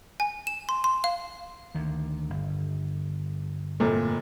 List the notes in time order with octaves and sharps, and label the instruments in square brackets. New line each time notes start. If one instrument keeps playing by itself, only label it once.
[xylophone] G#5
E7
C6
C6
F5
[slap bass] D2 D#3
G1
[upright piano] F1 A#2 A3